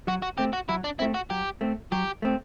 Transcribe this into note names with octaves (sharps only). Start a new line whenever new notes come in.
F#3 F#4
F#4
A3 C4 G4
F#4
F#3 E4
D4
A3 C4 E4
F#4
F#3 G4
A3 C4
F#3 G4
A3 C4